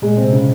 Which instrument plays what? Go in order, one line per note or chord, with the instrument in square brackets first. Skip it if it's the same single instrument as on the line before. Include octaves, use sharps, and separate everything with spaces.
[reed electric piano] A#2 [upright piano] G#3
[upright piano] C4
[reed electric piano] C3
[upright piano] C#3